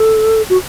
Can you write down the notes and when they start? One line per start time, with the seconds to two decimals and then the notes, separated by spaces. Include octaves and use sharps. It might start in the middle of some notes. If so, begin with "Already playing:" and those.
Already playing: A4
0.50 F#4